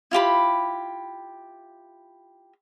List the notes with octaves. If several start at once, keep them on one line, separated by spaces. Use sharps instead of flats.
E4 F4 G4 B5